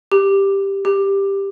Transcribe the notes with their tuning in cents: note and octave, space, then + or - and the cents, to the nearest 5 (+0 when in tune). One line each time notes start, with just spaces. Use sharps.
G4 +5
G4 +10